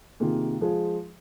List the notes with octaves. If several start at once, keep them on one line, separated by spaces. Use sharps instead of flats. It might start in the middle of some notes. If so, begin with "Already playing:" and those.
C3 D#3 A#3 F4 G#4
F3 G#3 F4 G#4